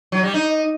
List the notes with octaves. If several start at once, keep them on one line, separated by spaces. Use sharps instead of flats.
F#3
G3
D#4